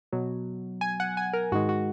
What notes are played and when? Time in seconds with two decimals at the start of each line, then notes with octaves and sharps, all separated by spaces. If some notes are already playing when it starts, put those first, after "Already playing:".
0.12 B2 F#3
0.81 G#5
1.00 F#5
1.17 G#5
1.33 A#4
1.52 G#2 D#3 G#3 F#4
1.69 F#4